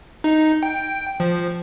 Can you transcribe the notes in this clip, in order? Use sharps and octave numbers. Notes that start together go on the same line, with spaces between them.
D#4
G5
F3